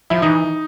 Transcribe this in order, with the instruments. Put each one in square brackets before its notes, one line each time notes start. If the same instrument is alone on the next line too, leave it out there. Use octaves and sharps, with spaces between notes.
[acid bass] F3 [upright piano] E4
[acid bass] E3 [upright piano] D#4